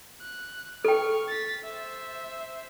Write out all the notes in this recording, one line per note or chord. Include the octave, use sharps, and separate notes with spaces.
F#6
A4 G5 C#6 F6
A6 B6
C5 E5